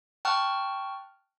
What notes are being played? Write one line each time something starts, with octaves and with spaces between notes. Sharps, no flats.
G5 A5 C#6 F6 F#6